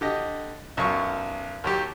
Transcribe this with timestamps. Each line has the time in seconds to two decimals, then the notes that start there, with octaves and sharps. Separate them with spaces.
0.01 D3 G4 D#5
0.77 B1 F#2 F#3 F4 C#6
1.64 D#2 F#3 G4